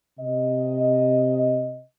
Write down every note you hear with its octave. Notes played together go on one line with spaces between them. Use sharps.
C3 D#5